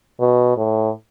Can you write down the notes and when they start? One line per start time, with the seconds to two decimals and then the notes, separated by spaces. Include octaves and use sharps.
0.20 B2
0.57 A2